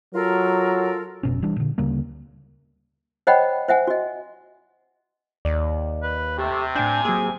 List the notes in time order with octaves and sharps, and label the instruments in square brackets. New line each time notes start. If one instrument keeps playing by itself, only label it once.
[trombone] F#3 [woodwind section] F4 A4 A#4
[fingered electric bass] F1 B2 C#4
E3 G3 D4
A#2 D3
D2 C#3 G3 A#3
[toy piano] C5 C#5 D#5 F#5 G5 B5
C5 E5 F#5 G#5
F#4 D#5
[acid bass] D#2 [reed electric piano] D5
[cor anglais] B4
[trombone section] C3 [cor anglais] A3 [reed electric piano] G4
[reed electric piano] A2 G6 [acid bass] D4 [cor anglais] G#5
[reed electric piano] F#3 A#3 [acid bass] G#4